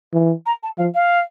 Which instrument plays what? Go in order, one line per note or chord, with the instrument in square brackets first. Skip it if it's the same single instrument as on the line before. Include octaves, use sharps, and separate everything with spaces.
[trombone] E3
[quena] A#5
A5
[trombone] F3 [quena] F5
[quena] F5